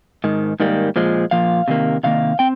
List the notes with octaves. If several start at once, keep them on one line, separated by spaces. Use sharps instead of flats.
G#2 D#3
G#2 D#3 G3 A#3
A#2 F3 G#3
A#2 F3 F5
C3 D#3 A#3
C3 D#3 A#3 F5
C4 G5